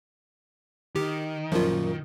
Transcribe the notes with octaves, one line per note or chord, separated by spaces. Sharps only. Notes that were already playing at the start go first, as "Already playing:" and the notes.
D#3 G4
F#2 A#2 F3 F4